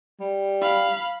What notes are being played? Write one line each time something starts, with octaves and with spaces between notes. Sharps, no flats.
G3
F5 B5